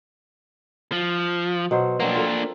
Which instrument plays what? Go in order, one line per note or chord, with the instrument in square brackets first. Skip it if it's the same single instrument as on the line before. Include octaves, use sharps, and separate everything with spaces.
[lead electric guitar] F3
[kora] B2 F#3 C5
[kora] F#3 C4 [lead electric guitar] A#3 D4
[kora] F4 A4 A#4